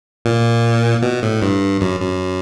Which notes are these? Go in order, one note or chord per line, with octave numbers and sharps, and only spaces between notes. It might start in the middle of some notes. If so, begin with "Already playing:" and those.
A#2
B2
A2
G2
F#2
F#2